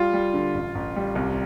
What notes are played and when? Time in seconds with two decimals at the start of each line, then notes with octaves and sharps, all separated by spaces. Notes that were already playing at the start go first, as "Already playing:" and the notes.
Already playing: G3 F4
0.13 G3
0.34 D3
0.55 A1
0.75 A1
0.96 G3
1.15 C2